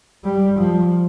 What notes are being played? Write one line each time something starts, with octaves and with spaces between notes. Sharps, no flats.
G3
F3